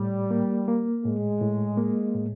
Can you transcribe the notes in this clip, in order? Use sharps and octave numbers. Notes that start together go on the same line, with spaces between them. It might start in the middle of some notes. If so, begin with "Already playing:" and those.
Already playing: A2 G3
A#3
A#3
A2 G#3
A2
A#3
A2